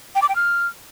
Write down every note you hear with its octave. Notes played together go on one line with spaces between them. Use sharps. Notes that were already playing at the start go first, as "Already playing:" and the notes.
G5
D6
G5
F6